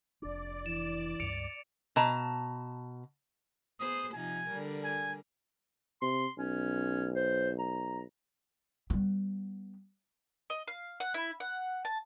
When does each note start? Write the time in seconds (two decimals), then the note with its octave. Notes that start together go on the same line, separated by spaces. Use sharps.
0.22 F1 D4 D5
0.66 E3 E7
1.20 C#2 G2 C#7 D7 F7
1.96 B2 A5 A#5
3.80 B3 G#4 C5 D#6
4.14 C3 F3 D#4 G#5
4.48 D3 G3 A#4
4.84 G#5
6.02 C3 C6
6.38 B1 C#4
7.15 C5
7.59 A#5
8.90 G3 B3
10.50 D#5
10.68 F5
11.00 F#5
11.14 E4
11.40 F#5
11.85 A5